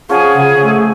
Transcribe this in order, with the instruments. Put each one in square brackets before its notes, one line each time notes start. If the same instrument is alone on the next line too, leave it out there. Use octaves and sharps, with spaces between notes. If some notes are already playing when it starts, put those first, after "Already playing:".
[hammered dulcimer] F3 C#4 [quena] G#4 [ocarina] F#5
[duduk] C#3
A3